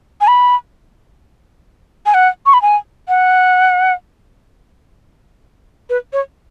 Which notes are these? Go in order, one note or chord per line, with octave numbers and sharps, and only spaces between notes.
G#5
B5
G#5
F#5
C#6
B5
G#5
F#5
B4
C#5